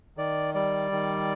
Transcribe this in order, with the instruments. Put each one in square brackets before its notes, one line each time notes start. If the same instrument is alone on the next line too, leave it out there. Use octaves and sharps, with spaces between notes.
[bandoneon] D#3 D5
G3 D5
D#3